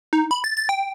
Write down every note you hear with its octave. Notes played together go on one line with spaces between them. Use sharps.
D#4
B5
A6
A6
G5